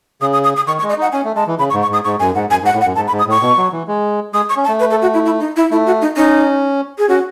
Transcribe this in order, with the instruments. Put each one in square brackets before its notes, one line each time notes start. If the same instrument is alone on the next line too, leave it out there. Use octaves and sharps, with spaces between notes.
[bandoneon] C#3 [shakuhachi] D#6
[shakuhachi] D#6
D#6
D#6
[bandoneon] D#3 [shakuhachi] C#6
[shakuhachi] C#6
[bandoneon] G#3
[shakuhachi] D#5
[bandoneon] D#4 [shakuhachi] F#5
[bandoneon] C#4 [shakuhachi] G#5
[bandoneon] A3
[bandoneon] G#3 [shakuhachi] A5
[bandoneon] E3
[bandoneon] C#3 [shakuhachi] B5
[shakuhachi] C#6
[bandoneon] G#2
[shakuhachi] C#6
[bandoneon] G#2 [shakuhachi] D#6
[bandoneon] G#2 [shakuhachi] C#6
[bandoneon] F#2 [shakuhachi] G#5
[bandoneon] G#2 [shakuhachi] F#5
[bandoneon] F#2 [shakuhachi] G#5
[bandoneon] G#2
[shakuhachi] F#5
[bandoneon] A2
[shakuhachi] F#5
[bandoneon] F#2
[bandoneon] G#2 [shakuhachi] A5
[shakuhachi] B5
[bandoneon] G#2
[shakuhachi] D#6
[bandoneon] A2 [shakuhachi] C#6
[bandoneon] B2
F#3
E3
G#3
[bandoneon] G#3 [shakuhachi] D#6
[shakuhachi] C#6
[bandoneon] C#4
[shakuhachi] A5
[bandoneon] A3
[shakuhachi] B4
A4
F#4
E4
E4
D#4
E4
[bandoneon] A3 [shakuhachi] E4
[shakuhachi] F#4
D#4
[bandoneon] C#4 [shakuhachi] D#4
[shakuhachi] G#4
[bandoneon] C#4 [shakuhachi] F#4